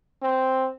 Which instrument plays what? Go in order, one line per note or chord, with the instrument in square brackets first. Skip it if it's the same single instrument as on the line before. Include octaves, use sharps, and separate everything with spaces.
[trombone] C4